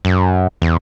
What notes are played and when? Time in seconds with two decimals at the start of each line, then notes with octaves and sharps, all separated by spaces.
0.05 F#2
0.62 E2